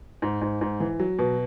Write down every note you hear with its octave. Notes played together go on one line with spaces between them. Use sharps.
G#2
G#2
G#2
E3
F#3
B2